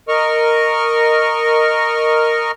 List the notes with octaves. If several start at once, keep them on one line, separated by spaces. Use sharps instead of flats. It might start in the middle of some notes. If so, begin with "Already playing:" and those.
A#4 D#5 C#6 F6